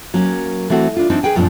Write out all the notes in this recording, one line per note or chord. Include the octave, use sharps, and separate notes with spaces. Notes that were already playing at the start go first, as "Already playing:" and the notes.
F#3 A#3 C#4
E3 A3 C4 F#4
D4 F4
E3 C4 D4 D#4
G#4 B4 G5 G#5
F#2 A#2 F3 B3 C4 D4